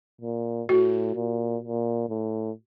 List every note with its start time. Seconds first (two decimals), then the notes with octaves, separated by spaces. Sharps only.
0.22 A#2
0.69 A2 F#4
1.15 A#2
1.62 A#2
2.09 A2